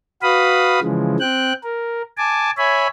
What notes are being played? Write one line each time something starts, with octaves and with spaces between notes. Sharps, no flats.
F#4 B4 F5 B5 D#6
C#3 E3 F3 G#3
C4 G5 F#6
A#4
G#5 A5 D6
C#5 E5 G#5 B5